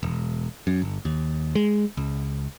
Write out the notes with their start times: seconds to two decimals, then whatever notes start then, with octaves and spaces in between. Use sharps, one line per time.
0.03 E1
0.67 F#2
0.82 G1
1.05 D#2
1.55 G#3
1.97 C#2